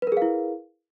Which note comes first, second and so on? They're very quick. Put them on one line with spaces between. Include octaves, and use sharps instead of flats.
B4 A#4 G#4 F5 E4